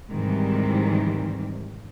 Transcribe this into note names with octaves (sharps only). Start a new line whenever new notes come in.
G#2 C3 D#3 E3 G3